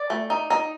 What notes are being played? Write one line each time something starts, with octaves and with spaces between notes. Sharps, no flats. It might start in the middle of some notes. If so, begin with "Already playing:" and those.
Already playing: D5
A3
D#4
D#4